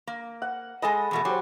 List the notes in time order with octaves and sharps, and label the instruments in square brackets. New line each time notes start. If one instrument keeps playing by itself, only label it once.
[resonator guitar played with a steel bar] A#3
[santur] F#5
[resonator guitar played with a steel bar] G#3 A4 D#5 [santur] G#4 G#5 B5
[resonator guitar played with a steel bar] E2 B2 A3
[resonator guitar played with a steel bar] F#3 [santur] G4 C5